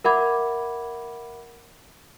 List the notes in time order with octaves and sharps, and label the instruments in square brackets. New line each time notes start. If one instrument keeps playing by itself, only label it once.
[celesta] A#4 E5 F#5 B5 D6 G#6